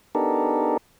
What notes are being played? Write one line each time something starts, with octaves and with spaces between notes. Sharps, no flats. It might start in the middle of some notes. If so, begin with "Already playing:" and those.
B3 D4 D#4 G4 A4 A#4